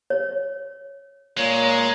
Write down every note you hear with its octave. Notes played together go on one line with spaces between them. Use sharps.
C#5
A#2 G#3 C#5